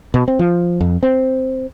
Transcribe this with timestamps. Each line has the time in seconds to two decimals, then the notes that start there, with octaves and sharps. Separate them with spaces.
0.14 B2
0.28 C4
0.39 F3
0.81 F2
1.03 C4